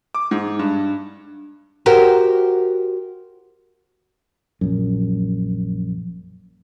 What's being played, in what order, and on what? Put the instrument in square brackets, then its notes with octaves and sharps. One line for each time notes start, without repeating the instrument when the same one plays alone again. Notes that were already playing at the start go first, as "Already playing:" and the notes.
[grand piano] D6
G#2
G2
[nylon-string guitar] F#4 G4 A#4 C5
[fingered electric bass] A#1 F#2